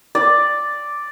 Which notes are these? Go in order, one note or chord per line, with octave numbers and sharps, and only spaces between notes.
D5